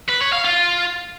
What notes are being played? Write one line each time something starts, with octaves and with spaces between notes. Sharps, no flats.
B4
C#5
F5
F4